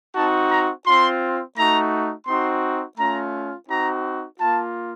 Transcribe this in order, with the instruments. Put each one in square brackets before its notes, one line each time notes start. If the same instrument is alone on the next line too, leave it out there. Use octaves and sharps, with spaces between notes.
[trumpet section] C4 D#4 F#4 A5
A#5
C4 F4 C6
A3 D#4 F#4 A#5
C4 D#4 F#4 C6
A3 C#4 F4 A#5
C4 D#4 F#4 A#5
A#3 F4 A5